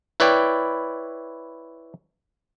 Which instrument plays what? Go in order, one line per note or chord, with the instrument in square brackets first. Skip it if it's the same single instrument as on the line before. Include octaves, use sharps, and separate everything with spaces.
[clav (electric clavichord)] E4 B4 C#5 D5 G5